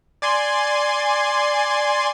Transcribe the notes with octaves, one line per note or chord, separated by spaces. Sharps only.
D5 G#5 C6